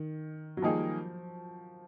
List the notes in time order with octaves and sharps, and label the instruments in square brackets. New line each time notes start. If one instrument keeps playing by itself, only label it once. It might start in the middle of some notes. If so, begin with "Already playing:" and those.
Already playing: [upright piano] D#3
F#3
[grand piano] D#3 G3 A#3 D#4 G#4 [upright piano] F3